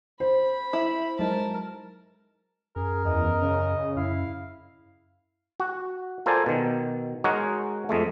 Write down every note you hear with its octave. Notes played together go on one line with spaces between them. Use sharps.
C5 B5
E4
F#3 G#3 D#4 A#4 A5
F#2 G#4 A#4
E2 D#5
C#3
F#2 E4 F5
F#4
F4 A4 A#4 C5 D5 G#5
B2 D#3
G#3 D#4 F#4 A#4 C#5 F#5
F2 G#3 A3